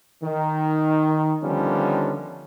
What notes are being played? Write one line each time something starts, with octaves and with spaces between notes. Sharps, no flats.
D#3
D3 D#3 F3 G3 B3 C#4